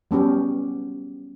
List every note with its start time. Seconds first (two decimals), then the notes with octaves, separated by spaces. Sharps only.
0.11 G3 B3 C#4 G4